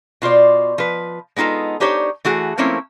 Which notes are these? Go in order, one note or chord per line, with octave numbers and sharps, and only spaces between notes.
B2 F4 C5 D5
F3 B4
G#3 B3 D#4 F4 A4
D4 D#4 G4 C5 C#5
E3 A3 F#4 G#4
F3 A3 A#3 C4 C#4 E4